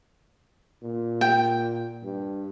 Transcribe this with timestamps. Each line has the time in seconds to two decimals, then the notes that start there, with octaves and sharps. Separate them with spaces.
0.82 A#2
1.21 G5
2.04 G2